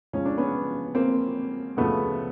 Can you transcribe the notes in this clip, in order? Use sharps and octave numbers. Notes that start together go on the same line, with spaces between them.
C#2 C#3 F3 C#4
D4
B3 C#4
A#3 C4
D2 C#3 F3 A3 B3